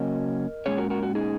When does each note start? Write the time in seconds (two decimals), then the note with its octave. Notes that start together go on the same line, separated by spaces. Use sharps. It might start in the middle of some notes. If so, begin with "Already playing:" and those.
Already playing: C#3 F#3 A#3 C#4 A#4 D#5
0.66 A#2 G#3 C#4 G#4 C#5
0.78 F#4 A#4
0.90 F#4 A#4
1.03 F#4
1.15 D#4 G#4